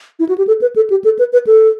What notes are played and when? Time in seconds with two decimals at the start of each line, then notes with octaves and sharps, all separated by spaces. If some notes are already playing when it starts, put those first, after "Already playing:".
0.19 E4
0.29 F#4
0.38 G4
0.47 A4
0.62 B4
0.76 A4
0.90 G4
1.04 A4
1.19 B4
1.33 B4
1.47 A4